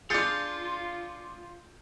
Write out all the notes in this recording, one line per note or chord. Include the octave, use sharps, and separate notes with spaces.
D4 F4 G#4 F5 G6 A6 C#7